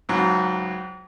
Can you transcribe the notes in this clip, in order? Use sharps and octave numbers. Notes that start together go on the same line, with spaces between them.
C#2 G#2 F#3